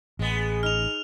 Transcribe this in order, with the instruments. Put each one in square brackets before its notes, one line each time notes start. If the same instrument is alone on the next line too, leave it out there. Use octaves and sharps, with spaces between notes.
[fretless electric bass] A1 [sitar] G#3 B3
[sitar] D#4 [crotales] F6 F7